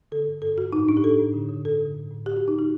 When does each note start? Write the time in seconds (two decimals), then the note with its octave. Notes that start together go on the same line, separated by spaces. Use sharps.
0.12 D3 A4
0.27 G2
0.42 G2 A4
0.57 G2 F#4
0.73 A2 D#4
0.89 A2 D4
0.97 G4
1.04 A2 A4
1.19 A2
1.34 D3
1.49 D3
1.64 G2 A4
1.80 D3
1.95 A2
2.11 A2
2.26 A2 G4
2.37 F#4
2.42 A2
2.48 D#4
2.57 D3 F#4